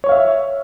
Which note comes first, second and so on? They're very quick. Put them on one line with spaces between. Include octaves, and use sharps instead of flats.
C#5 C#6 F5 E5